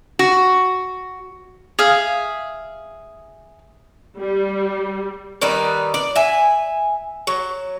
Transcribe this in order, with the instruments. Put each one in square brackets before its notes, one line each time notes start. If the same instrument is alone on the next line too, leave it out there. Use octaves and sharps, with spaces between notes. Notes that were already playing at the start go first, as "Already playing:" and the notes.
[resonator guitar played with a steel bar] F#4
[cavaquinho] G#4 E5 F5
[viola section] G3
[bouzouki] D#3 G3 D#4 B4
D5
E5 G#5
F#3